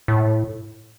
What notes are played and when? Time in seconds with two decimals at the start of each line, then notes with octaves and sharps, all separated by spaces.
0.08 A2